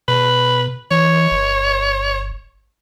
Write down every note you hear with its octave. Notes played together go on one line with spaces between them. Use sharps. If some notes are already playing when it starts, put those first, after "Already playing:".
B2 B4
E3 C#5
G1